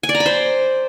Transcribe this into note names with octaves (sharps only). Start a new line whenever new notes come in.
G#5
D5
A#5
B5
C5